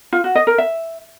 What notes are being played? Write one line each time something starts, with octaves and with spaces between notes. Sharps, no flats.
F4
F#4
D#5
A#4
E5